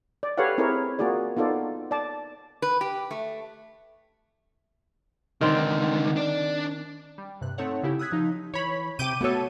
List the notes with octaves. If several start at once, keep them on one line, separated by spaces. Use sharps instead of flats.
D5
G4 A4 B4 C#5 F5 F#5
C4 E4 G#4 A#4 C#5
A#3 F4 F#4 G#4 D5
B3 D#4 F4 A4 D5
D5 A5
B4
G4
A3
C#2 D3 D#3 C4
D4 D5
G3
G2 C3 F#6
A3 C4 D#4 A4 C#5 F#5
C#3 E4 G4
D#6 E6 F#6 G#6 B6
F3 D#4
E3 C#5 B5
C3 G5 D6 G6 D#7
A3 B3 F#4 A4 C#5